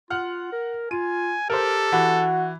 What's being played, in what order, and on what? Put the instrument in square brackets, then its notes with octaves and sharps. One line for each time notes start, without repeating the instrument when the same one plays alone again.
[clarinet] F4 [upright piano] F#5 F6
[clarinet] A#4
[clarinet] F4 [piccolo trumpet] G#5 [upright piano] D#7
[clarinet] G4 [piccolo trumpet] A4 [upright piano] A#4 C5
[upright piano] E3 [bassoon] F#4